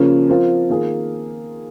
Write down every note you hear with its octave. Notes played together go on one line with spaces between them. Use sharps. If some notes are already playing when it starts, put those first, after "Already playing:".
Already playing: C#3 F3 A#3 C#4
F3 C4 F4 A#4
D#3 A#3 F4 G#4